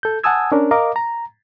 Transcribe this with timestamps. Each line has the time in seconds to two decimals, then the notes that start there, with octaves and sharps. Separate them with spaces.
0.03 A4 G6
0.24 F#5 G#5 A5 D#6 E6 G#6
0.52 C#4 D4 A#4
0.71 A#4 D#5 F5 A#5 D6
0.96 A#5